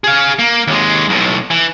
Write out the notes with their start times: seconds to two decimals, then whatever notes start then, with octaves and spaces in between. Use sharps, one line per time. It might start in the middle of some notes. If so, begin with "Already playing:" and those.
0.04 G#4 F5
0.39 A#3
0.68 D#2 G#3
1.09 B1 A2
1.50 E3